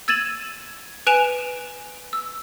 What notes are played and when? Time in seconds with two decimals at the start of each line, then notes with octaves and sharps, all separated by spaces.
0.08 E6 G#6 A6 D#7 E7 F#7
1.07 B4 G#5 F#6 D7 E7 F7
2.13 E6